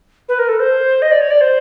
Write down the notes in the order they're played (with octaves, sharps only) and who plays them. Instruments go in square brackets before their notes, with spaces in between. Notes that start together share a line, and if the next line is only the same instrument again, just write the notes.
[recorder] B4
A#4
A4
C5
D#5
D5
C#5
D5
C5